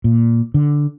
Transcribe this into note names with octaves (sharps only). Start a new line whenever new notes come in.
A#2
D3